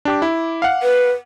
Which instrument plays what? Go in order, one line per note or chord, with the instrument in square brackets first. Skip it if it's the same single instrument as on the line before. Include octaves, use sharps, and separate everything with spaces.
[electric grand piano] D4 G4 D6
E4
F5 F#5
[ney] B4